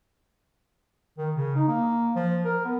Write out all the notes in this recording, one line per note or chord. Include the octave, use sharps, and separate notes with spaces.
D#3
C#3
D#4
A#3
F3
A#4
B3